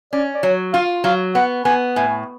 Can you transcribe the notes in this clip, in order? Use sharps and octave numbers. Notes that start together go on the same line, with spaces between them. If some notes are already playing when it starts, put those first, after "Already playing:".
C#4 D5
D5
F#3 C#5
F4 F5
F#3 F5
B3 F#5
B3 G#5
A2 G#5